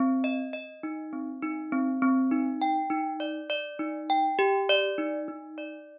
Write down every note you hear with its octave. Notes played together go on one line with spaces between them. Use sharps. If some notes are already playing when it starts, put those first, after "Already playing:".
Already playing: C4
D#5
D#5
D#4
C4
D#4
C4
C4
D#4
G5
D#4
D5
D5
D#4
G5
G4
D5
D#4
D#4
D5